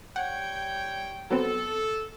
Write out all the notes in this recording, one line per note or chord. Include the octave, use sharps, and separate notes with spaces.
G3 C#5 F#5 G5
F#3 B3 C4 A4